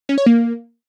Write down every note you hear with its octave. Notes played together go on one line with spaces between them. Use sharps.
C#4
C#5
A#3